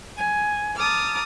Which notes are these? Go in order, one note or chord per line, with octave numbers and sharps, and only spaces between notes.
G#5
A5 A#5 D6 D#6 F6